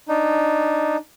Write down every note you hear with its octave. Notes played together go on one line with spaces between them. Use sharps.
D4 D#4